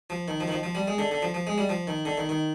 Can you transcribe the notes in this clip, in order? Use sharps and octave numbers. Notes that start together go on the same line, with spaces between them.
F3
D#3
F3
D#3
F3
F3
G3
G#3
D3
D3
F3
F3
G#3
G3
F3
D#3
D3
D#3
D#3